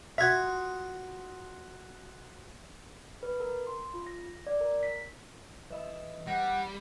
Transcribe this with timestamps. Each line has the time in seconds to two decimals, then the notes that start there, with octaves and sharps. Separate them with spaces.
0.18 F4 F#4 E5 D#6 G#6
3.23 B4
3.40 A#4
3.67 C6
3.94 F4
4.07 A#6
4.47 D5
4.60 A#4
4.83 B6
5.70 E3 B4 D#5 E5 B5
6.27 G3 F#5 A#6